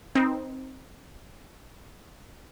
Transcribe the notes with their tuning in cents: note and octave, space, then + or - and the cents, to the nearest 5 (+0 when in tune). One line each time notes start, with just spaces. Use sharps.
C4 +0 D#4 +0 B4 -35